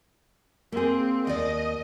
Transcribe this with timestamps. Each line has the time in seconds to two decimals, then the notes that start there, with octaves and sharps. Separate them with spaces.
0.72 A#3 C4 G#4
1.27 D#2 D5 D#5